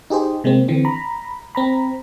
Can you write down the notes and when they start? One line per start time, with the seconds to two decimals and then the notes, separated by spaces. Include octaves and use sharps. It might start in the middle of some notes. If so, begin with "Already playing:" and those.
0.10 D#4 G4 G#4 C5
0.44 C3 G#3 A#3 C4
0.68 D3 E3 C4
0.85 A#5 B5
1.55 C4 A#5 B5